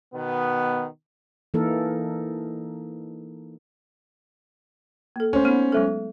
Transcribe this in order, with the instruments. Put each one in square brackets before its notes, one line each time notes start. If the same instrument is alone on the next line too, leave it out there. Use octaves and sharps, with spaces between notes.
[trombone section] B2 D#3 B3
[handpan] E3 A#3 D#4 A4 A#4
[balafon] A#3 A4
[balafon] A3 [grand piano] C#4 C5
[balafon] B3 D#4
F#3 G#3 A4